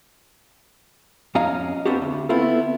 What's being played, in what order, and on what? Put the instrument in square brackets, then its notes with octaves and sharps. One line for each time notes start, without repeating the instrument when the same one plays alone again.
[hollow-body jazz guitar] F2 C#4 D#5 F5 A#5
B3 C4 D4 F#4 G4
D2
B3 C4 E4 F4 A4